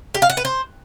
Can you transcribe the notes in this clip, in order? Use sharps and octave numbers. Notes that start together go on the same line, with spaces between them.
G4
F5
F#5
B4
C5